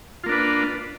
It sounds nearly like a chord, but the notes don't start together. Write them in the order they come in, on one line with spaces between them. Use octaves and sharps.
F4 A#3 D4 B4